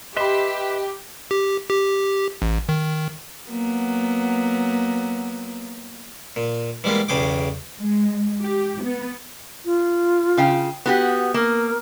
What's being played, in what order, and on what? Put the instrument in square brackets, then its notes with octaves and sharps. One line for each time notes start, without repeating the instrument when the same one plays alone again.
[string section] G4 [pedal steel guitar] B4 E5 C6 [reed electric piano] D#5 B5
[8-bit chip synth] G4
G4
A1
D#3
[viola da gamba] F#3 A#3 B3
[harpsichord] A#2
E3 G3 G#3 A#3 B3
B1 E2 C#3 G#4 G5 D6
[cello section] G#3
G4
B3
[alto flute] F4
[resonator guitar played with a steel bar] C#3 F5 G5
B3 F#4 G4
[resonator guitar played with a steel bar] A#3 [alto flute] A#4